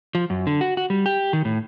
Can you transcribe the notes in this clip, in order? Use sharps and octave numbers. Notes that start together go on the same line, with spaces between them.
F3
F#2
D3
F#4
F#4
G3
G4
D#3
A2